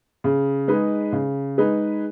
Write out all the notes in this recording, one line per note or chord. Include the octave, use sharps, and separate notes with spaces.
C#3
G#3 D#4 G#4 B4
C#3
G#3 D#4 G#4 B4